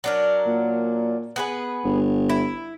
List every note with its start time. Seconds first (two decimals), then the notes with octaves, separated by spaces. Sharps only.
0.04 F#3 D4 A#4
0.46 A#2
1.36 B3 G#4 B4
1.84 G1
2.29 E4